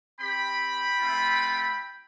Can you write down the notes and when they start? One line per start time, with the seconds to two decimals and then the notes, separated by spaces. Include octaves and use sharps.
0.20 C4 G4 G5 B5
0.99 A3 C4 F4